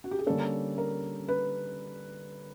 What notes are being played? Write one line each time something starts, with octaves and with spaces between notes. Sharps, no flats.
F#4
G4
G#4
D3 G3 A#3 C#4 A4
A#4
B4